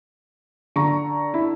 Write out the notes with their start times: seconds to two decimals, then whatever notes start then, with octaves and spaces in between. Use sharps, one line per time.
0.76 D3 A#5 C#6
1.34 E4